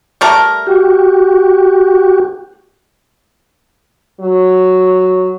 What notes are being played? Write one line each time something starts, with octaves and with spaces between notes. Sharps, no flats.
G3 A3 A#4
F#4 G4
F#3